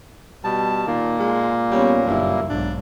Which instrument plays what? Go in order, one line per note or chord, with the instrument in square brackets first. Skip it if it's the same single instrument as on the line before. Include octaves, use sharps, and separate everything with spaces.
[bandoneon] B2 A5 [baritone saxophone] G3
[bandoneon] A#2 A#3 [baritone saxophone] D#3
[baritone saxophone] G#3
[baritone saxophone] G3 [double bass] B3 C#4
[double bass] F#1 E4 [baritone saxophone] G2
[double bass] B1 G#2 [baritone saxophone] D4